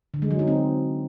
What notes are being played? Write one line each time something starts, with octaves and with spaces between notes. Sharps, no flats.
D3
G#3
F#3
D#4
C4